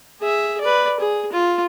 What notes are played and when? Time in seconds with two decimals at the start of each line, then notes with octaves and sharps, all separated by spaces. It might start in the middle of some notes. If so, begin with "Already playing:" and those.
0.21 G#4 E5
0.61 B4 D5
1.00 G#4
1.32 F4